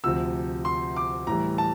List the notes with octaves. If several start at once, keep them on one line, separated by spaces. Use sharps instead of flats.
D2 C3 F3 E6
C6
D6
A2 E3 G3 A#5
A5